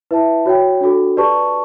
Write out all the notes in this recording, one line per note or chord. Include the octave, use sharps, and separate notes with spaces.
E4 B4 E5 A5
F#4 C#5 G5
D4 F#4 A4
G4 B4 D5 A5 C#6